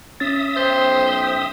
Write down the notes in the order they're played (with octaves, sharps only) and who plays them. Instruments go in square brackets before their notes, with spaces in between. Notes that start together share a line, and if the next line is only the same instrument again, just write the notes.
[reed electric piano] C#4 A6 [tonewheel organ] E5 D#6
[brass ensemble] B1 G5 [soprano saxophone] C5